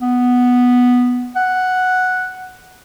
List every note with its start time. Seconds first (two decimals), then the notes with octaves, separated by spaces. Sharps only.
0.02 B3
1.36 F#5